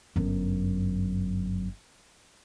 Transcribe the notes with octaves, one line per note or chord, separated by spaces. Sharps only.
G1 F#2